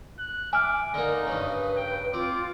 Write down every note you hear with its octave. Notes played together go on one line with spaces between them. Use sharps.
F#6
E5 G#5 D6 F6
D3 A#3 D#4
G2 C#3 B4
G5
C4 F4 D6